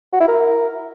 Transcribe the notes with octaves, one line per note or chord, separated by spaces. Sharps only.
F#4
E4
A#4